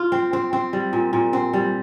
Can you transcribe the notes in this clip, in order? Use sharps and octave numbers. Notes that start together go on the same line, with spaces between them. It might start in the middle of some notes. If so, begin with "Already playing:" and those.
Already playing: F4
C4
C4
C4
G3
A#2
A#2
C4
G3